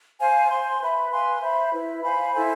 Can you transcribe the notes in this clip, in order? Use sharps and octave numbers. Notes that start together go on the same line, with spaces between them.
C5 F5 G#5
C5 G#5 C6
B4 E5 B5
B4 F5 G#5 C6
C5 E5 B5
E4 B4 E5
C5 F5 G#5 B5
E4 A4 C5 G#5